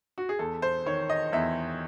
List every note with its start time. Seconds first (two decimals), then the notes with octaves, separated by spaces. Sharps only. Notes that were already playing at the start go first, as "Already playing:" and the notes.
0.18 F#4
0.29 G#4
0.39 E2 A4
0.62 C5
0.86 D#3 C#5
1.10 D#5
1.33 E2 E5